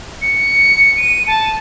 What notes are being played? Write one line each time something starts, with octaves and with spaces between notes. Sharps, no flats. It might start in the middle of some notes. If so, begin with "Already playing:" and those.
C#7
D#7
A5